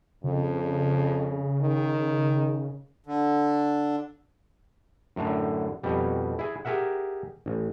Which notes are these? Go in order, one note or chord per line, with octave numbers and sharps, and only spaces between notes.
F2 C#3
D#3
D3
F#2 A2 D3
F2 B2 G3
E4 G#4
G4 G#4 A#4 E5 F#5
A1